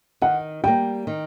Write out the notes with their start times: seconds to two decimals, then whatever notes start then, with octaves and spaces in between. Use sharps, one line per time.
0.22 D#3 F#5
0.64 G3 A#3 G5
1.07 D#3